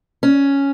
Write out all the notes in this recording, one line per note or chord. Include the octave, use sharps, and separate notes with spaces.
C#4